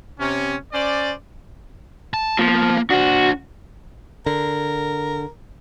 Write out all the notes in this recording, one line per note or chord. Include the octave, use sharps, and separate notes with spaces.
C3 C#4
C#4 C5 D5
A5
F3 A#3 B3
D4 F#4 C5
D3 A#4